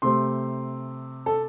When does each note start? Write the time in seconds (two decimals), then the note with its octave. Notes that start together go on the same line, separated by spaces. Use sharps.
0.02 C3 A3 C4 C6
1.26 A4